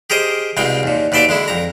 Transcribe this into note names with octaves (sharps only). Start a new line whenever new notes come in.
G4 G#4 A#4 C5 D#5
C2 B2 G#3 F5 G5
D#2 A#2
D#2 B2 D5 E5 C6 D6
D3 G#3 E4
F2 A#5